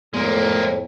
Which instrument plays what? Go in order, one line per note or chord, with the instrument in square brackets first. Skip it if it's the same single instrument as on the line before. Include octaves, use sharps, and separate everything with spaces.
[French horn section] F2 A2 [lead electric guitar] G#3 A#3 [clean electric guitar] B3 G#4 D5